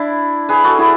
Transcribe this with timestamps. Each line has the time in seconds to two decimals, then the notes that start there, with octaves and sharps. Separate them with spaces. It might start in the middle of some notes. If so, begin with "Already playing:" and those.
Already playing: D4 E4
0.49 G#4 B4
0.64 F#4 A4
0.79 E4 G#4